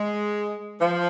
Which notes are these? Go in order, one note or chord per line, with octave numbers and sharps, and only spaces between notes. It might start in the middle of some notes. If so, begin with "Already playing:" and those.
Already playing: G#3
F3